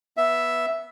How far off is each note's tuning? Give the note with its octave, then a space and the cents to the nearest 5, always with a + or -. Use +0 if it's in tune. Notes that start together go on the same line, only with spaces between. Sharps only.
B3 -15 E5 +0